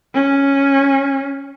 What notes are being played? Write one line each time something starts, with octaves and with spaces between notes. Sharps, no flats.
C#4